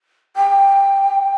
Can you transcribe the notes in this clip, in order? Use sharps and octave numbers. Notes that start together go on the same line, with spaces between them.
G5